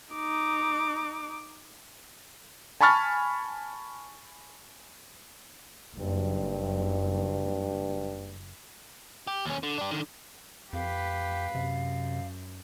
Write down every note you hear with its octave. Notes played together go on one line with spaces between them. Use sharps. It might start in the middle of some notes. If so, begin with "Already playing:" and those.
D#4 D6
G#5 A5 B5 C#6 F6 A6
F#1 G2
G4
D#2 C#4
D3
D4 G4
D3 D#3
F2 G4 B4 F5
F#2 C3